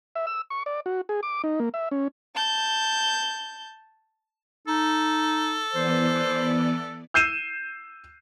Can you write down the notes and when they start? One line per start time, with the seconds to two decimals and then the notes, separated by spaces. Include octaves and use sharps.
0.16 E5
0.27 E6
0.50 C#6
0.66 D5
0.86 F#4
1.09 G#4
1.23 D6
1.44 D#4
1.60 A#3
1.74 E5
1.91 C#4
2.35 A5 G6
4.68 D#4 A4
5.73 E3 B3 C5 D5
7.14 E6 G6 C7 D#7 E7